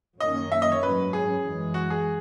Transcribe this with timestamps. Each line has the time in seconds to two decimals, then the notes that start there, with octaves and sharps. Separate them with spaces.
0.20 F#2 D#3 A#3 C#4 D#5
0.52 E5
0.62 D#5
0.72 C#5
0.82 G#2 F#3 C#4 B4
1.13 G#4
1.43 F#2 E3 G#3
1.74 F#4
1.90 G#4